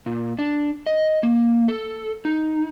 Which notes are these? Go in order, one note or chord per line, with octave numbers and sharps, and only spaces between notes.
A#2
D4
D#5
A#3
A4
D#4